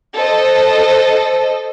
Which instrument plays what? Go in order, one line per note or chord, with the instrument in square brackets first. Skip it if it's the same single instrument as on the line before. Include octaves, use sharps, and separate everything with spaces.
[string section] A4 C5 D#5